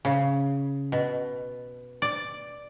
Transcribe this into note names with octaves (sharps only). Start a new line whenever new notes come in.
C#3
B2
D5